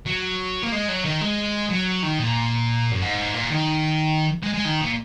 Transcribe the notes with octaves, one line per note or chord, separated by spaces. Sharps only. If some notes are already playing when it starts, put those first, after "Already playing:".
F#3
A#3
G#3
F#3
D#3
G#3
F#3
D#3
A#2
F#2
G#2
A#2
D#3
G#3
G#3
D#3
A#2